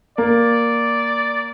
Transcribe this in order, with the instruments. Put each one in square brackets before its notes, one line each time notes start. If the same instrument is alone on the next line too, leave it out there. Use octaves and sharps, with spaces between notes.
[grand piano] A#3 [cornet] D5